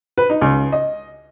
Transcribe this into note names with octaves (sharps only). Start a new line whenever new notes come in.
B4
D#4
C#2
D#5